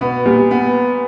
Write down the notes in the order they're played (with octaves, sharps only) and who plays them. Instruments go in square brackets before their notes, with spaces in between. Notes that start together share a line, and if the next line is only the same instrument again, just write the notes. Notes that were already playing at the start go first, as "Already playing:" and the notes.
[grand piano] B2 [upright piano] B3
[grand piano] A#2 [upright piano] G3
[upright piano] B3